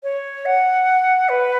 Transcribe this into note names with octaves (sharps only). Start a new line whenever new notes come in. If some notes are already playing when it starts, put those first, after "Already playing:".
C#5
F#5
B4